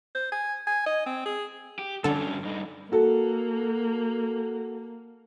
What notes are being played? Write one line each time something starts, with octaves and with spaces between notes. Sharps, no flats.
C5
G#5
G#5
D#5
C4
G#4
G4
G2 D3 C#4 A4
G2 D#4
A#3 F#4 A4